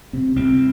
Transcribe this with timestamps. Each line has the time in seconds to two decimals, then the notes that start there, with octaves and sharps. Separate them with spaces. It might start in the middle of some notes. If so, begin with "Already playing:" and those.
0.13 C3 C4
0.36 C2 C4